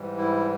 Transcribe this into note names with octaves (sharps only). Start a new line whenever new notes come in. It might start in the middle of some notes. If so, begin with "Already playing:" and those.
Already playing: G#2 E3 G3
E4